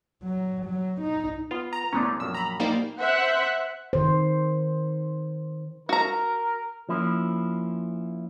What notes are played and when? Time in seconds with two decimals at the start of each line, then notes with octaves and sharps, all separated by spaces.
0.23 F#3
0.65 F#3
1.01 D#4
1.51 B3 F4
1.73 A#5
1.93 C2 A3 B3 C#4 C5 D5
2.20 A#1 F#2 E6
2.35 A#5 B5
2.60 G3 A#3 D#4 C5 D5 F5
3.01 C5 E5 F#5 F#6
3.93 D#3 C5
5.89 F#4 A#4 A#5
6.89 F3 A#3 C#4 E4